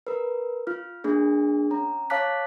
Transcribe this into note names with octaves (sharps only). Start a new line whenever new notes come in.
A#4 B4
F4 F6
A#3 D4 G#4
C#4 A#5
C#5 F5 A5 D6 F#6 B6